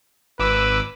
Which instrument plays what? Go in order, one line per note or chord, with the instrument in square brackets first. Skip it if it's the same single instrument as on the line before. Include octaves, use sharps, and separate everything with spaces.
[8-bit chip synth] G#1 D6 E6 [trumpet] B4